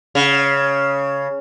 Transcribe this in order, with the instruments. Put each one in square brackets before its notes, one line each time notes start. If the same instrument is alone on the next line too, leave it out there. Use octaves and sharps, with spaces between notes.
[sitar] C#3